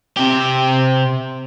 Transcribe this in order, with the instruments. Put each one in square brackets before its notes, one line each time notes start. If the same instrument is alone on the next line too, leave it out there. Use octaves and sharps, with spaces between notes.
[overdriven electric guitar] C3 G4